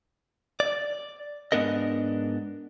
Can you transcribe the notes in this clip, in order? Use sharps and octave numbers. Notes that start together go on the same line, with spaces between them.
D5
G#2 B3 D4 A#4 D#5